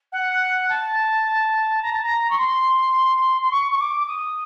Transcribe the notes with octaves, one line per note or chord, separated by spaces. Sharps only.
F#5
A5
A#5
A5
A#5
C#6
C6
C6
C#6
C#6
D6
D6
D#6